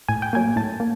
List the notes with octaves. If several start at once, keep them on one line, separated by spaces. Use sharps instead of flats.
A2 G#5
G5
F#3 A#3 G#5
A2 A5
A#3